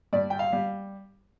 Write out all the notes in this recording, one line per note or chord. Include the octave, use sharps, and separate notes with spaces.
G2 D5
G5
F5
G3